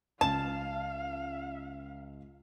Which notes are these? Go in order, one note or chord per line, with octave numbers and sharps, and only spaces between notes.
C#2 F5 A5 E7